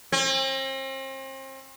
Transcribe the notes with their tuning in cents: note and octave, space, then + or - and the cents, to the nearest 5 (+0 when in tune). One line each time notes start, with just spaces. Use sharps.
C4 +40